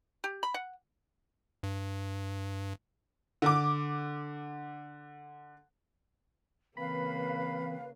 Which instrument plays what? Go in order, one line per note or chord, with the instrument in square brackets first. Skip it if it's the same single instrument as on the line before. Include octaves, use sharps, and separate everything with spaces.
[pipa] G4
B5
F#5
[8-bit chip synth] G2
[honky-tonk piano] D3 D6
[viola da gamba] C#3 A#3 [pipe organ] E3 C4 [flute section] B4 F5 [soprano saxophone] B5